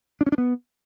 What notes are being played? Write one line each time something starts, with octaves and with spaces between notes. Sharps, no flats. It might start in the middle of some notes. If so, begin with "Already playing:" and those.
D4
C#4
D4
B3